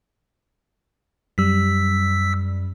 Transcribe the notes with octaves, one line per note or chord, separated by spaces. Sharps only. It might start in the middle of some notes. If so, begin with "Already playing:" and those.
F#2 G3 E6 B6